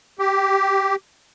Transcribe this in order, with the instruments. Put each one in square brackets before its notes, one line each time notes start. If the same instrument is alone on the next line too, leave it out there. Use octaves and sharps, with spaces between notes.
[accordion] G4